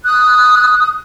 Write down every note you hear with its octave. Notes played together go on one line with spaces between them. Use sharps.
D#6 F#6